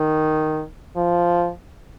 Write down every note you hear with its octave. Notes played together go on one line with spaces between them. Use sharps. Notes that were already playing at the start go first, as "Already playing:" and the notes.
Already playing: D#3
F3